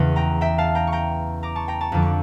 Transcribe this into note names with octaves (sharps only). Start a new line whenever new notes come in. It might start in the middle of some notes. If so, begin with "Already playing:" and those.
Already playing: E2 C#3 E3 C#6
G5 A#5
E5 G5
F5 A5
G5 A#5
C#6
G5 A#5
A#5 D6
A5 C#6
G5 A#5
A5 C#6
F2 D3 F3 D6
C#6